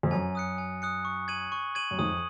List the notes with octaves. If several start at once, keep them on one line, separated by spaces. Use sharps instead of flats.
F2
F#2 G#5
D#6 F#6 C#7
G#5
D#6 F#6 C#7
C#6
G#6 D#7 F#7
C#6
G#6 D#7 F#7
F#2
F2 G#2 D#6